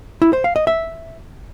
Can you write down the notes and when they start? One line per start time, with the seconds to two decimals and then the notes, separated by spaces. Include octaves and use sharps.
0.22 E4
0.33 C5
0.44 F5
0.56 D#5
0.67 E5